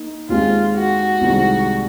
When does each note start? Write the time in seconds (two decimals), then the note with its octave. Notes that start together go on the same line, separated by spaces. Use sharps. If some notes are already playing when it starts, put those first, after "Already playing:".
Already playing: A#3 D#4
0.29 D#2 D#3 G#3 C4 F4
0.76 F#4
1.21 C2 C3 D#3 G#3 C4